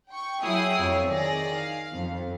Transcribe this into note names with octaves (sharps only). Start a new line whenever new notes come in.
G5 C#6
F#3 E4 G#4 G5 D#6 C7
F2 C#5
D#3 G#4 D5 A#6
F5
F2